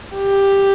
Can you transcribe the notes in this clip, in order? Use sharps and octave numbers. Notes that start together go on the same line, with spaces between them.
G4